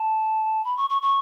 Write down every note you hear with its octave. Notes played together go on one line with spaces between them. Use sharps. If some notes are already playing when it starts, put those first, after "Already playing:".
Already playing: A5
B5
C#6
C#6
C#6